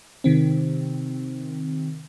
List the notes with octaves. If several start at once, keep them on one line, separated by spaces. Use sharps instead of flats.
C3 D#3 C4